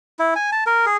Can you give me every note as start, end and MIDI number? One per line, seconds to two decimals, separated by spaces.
0.19 0.34 64
0.36 0.50 80
0.52 0.64 81
0.66 0.86 70
0.86 0.97 68